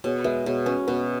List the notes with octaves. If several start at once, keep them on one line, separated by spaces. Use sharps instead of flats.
B2 G#4 C#5
G#3 B4 E5
B2 G#4 C#5
C#4 F#4 B4
B2 F#4 B4